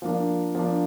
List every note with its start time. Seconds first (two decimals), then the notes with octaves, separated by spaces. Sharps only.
0.02 F3 A#3 D4
0.55 F3 A#3 D4